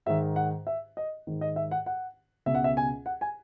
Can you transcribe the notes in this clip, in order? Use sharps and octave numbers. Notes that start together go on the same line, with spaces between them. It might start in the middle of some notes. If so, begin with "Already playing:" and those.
G#2 D#3 E5
F#5
E5
D#5
G#2 D#3
D#5
E5
F#5
F#5
C#2 B2 E5
F#5
E5
G#5
F#5
G#5